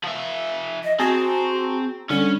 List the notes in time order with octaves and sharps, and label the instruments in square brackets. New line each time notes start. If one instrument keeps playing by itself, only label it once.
[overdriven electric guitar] F3 E5
[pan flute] D#5
[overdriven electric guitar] C4 [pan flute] F#4 [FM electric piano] G#4 A5 A#5
[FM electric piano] D3 [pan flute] G3 [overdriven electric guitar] C#4